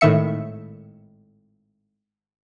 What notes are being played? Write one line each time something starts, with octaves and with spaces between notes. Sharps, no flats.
G#1 A2 D#3 E5 C#7